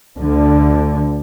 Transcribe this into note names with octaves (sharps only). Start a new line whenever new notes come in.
D2 D3